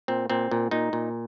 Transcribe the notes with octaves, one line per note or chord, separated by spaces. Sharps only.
A#2 C4
A#2 C4
A#2
A#2 D#4
A#2